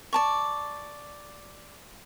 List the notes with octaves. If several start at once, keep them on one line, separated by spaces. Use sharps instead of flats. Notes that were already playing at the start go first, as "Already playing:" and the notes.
D5 A5 C#6